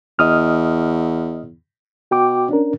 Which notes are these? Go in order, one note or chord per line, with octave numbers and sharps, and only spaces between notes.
E2 D#5 D#6 F6
B2 F#4 G5 D6
C#4 D4 A#4